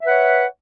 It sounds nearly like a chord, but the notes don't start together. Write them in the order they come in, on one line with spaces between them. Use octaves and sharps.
E5 B4 F#5 C#5